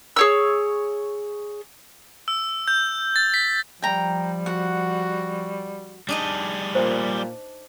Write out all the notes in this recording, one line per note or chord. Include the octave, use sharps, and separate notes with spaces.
G#4 C#5 E6
E6
G6
A6
B6
F3 G3 G5 A#5
F#4 F#5
G3 D4 D#4 G#4 D#5
A#2 C5